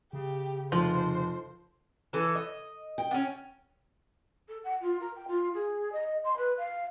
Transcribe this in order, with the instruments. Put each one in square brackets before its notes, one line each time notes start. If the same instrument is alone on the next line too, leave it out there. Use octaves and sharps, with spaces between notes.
[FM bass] C#3 [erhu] G4
[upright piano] F1 [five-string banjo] F3 [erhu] C5
[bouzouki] E3 A4
D#5
[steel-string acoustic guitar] G5
[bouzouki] B3 C#4
[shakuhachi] A4
F#5
F4
A#4
G5
F4
G#4
D#5
C6
B4
F5